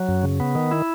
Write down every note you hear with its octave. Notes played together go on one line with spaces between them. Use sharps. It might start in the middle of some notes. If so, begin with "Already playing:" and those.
Already playing: F#3
F#2
C#3
B3
D#3
E4